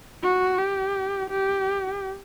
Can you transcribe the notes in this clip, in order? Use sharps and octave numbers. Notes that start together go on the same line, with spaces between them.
F#4
G4
G4